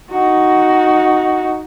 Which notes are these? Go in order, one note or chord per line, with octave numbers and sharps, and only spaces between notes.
D#4 F#4